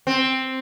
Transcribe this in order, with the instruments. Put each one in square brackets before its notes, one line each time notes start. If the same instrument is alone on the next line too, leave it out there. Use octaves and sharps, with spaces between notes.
[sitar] C4